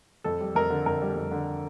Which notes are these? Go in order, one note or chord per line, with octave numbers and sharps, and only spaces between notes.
F2 A4
G3
F2 A#4
D3
F2 A#4
G3
F2
D3